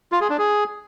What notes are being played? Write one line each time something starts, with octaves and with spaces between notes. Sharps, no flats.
F4
G#4
D4
G#4